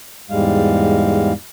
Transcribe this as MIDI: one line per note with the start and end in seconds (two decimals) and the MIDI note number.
0.30 1.32 40
0.30 1.32 44
0.30 1.32 55
0.30 1.32 56
0.30 1.32 77